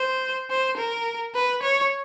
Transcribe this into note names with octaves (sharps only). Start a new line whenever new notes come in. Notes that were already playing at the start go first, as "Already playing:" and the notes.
Already playing: C5
C5
A#4
B4
C#5